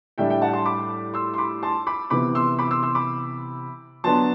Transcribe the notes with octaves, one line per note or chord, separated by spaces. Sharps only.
A2 G3 D4 E5 G5
E5 G5
F#5 A5
A5 C6
B5 D6
C6 E6
C6
B5 D6
A5 C6
B5 D6
C3 E3 B3 B5 D6
C6 E6
B5 D6
C6 E6
C6 E6
B5 D6
F#3 B3 D4 A5 C6